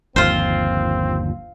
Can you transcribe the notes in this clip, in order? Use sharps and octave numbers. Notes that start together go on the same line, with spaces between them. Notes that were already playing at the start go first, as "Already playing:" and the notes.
G1 D#2 F3 C4 F4 C5